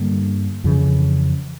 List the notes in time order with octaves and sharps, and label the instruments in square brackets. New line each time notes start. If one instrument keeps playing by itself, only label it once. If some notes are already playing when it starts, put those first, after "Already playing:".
Already playing: [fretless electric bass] G2 D3 G3 A#3
F2 C#3 E3